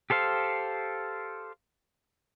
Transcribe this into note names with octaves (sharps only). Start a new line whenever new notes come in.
G4 A4 C5 F5